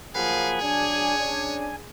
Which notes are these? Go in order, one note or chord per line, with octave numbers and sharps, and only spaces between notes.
F3 F#3 A#3 G#4 F5 F#5 B5
F#3 D4 C#5 G#5
C#4 D4